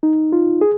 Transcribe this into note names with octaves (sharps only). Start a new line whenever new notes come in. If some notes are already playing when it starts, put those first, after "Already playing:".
D#4
F4
G#4